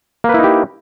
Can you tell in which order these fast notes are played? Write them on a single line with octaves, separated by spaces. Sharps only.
A#3 B4 E4 D#4 G4